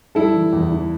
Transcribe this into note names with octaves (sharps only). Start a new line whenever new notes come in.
G3 E4 A4
E3
E2
E3